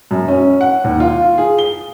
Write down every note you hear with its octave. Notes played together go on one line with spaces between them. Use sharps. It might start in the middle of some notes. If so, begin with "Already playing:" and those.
F#2
C#4
F#5
D#2
F4
G#4
G7